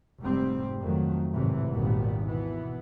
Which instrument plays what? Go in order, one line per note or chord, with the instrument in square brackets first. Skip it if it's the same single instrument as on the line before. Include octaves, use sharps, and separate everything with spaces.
[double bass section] F1 G#2 G3 C4
F2 D#3 F#3 A3
G#1 A2 C3 E3
G#1 D#2 A#2 G3 B3
B2 E3 B3